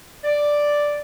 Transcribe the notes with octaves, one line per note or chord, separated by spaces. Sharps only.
D5